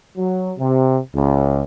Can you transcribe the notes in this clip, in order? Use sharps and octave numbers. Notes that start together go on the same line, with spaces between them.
F#3
C3
C#2